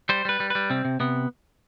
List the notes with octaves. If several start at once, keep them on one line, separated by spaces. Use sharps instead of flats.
G3 C5
G3 B4
G3
G3 B4
C3 C4
C3
C3 B3